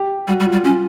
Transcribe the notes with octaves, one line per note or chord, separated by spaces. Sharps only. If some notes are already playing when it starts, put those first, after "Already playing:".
Already playing: G4
G3 F#4
G3
F4
G3
C#4 F4